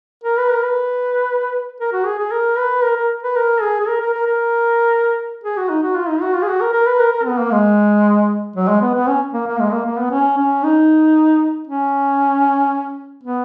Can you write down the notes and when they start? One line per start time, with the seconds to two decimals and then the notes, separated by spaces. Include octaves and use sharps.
0.24 A#4
0.37 B4
0.50 A#4
0.63 B4
1.80 A#4
1.93 F#4
2.06 G#4
2.19 G#4
2.32 A#4
2.58 B4
2.83 A#4
2.96 A#4
3.23 B4
3.36 A#4
3.62 G#4
3.80 G#4
3.88 A#4
4.01 A#4
4.14 A#4
4.26 A#4
5.44 G#4
5.57 F#4
5.69 D#4
5.82 F#4
5.96 F4
6.09 D#4
6.21 F#4
6.34 F4
6.42 G#4
6.48 F#4
6.60 A#4
6.73 A#4
6.86 B4
7.00 A#4
7.12 A#4
7.25 B3
7.38 A#3
7.51 G#3
8.56 F#3
8.68 G#3
8.82 B3
8.95 B3
9.08 C#4
9.33 A#3
9.47 A#3
9.60 G#3
9.72 A#3
9.85 A#3
9.98 B3
10.11 C#4
10.37 C#4
10.63 D#4
11.67 C#4
13.23 B3